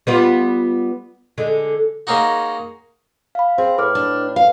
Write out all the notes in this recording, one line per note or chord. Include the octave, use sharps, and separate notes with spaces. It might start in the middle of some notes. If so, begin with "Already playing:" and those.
G3 B3 F4
D3 G#3
G#3 A#3 C#4 D#4 F#4
F5 B5
C4 G#4
A2 B4 D6 F6
D4
B4 F5